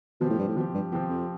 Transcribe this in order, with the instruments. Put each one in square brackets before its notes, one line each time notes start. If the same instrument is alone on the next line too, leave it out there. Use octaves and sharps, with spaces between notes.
[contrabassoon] B2 [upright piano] F3 C4 G4
[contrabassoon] A2
G2
A2
[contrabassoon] B2 [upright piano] F3 C4 G4
[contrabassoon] G2
[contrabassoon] E2 [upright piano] F3 C4 G4
[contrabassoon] F2